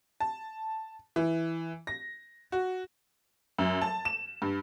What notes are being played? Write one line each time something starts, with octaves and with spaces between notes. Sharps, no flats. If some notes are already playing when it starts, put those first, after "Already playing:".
A5
E3
A#6
F#4
F#2
A5
E7
G2